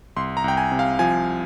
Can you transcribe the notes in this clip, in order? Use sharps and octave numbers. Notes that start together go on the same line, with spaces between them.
C2 C6
A#5
C2 G5
G#5
C3
F5
F3 G#5